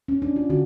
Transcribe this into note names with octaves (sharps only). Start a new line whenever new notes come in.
C#4
D4
F4
D3 F#4